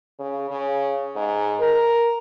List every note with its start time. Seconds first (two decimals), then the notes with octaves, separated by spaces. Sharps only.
0.20 C#3
0.51 C#3
1.16 G#2
1.60 A#4